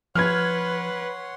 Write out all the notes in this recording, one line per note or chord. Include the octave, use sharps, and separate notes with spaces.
F3 B4 C#5 F#5 C6 F6 G#6